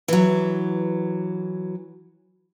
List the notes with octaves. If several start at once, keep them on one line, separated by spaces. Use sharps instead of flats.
E3 F#3